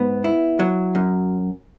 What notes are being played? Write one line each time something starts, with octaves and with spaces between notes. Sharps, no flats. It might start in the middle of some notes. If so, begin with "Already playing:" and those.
Already playing: G#2 B3
E4
F#3
F#2